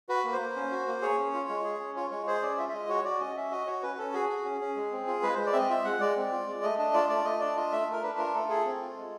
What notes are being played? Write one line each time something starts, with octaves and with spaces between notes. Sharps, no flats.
F#4 B4
A#3
C5
A#3
C#4
F#4
A#3
G#4 C#5
C#4
F4
G#3
G#4
C#4
F4 C#5
G#3 C#5
G#4 C5
C#4 D5
F4 E5
E5
G#3 D#5
F#4 C#5
F#4 D5
C#4 D#5
C#4 E5
F#4 D#5
F#4 C#5
C#4 B4
C#4 A4
F#4 G#4
F#4
C#4
C#4
G#3
C4
F4
G#3 B4
G#3 C5
D5
C4 D#5 E5
F4 E5
G#3 F#5
G#3 D5
C4
F4
G#3
A3 D#5
D4 D#5
F4 D5
A3 D5
A3 D#5
D4 D5
F4 D#5
A3 E5
A3 A#4
D4 B4
F4 A#4
A3 A4
G#4 A4
C4
F4
G#3